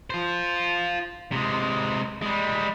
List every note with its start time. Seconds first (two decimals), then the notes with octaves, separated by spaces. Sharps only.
0.10 F4 C5
1.32 C3 G#3
2.22 G3 G#3